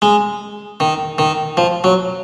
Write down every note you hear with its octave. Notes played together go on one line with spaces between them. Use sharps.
G#3
D#3
D#3
F3
F#3